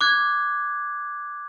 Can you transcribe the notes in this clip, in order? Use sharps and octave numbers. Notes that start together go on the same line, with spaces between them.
D6 F#6 G#6